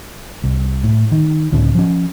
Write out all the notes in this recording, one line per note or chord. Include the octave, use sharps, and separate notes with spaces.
C2
A2
D#3
C#2 A2 D3 C#4
F3 C#4